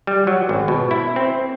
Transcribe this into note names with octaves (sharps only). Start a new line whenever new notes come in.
G3
F#3
G#1
B2
E4
C4